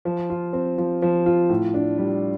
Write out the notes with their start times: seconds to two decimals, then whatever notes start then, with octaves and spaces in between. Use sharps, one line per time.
0.05 F3
0.30 F4
0.53 C4
0.78 F3
1.02 F3
1.26 F4
1.49 A2
1.74 D4
1.98 G3